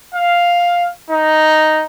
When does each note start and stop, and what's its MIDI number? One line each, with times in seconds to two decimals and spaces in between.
0.15 0.86 77
1.10 1.85 63